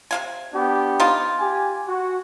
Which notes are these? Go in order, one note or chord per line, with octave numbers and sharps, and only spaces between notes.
C3 F5 G#5
B3 D4 G4
C4 D#4 F4
G4 G#5
F#4